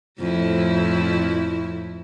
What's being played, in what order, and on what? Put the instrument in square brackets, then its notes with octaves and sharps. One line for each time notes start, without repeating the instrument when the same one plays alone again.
[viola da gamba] F2 A2 E4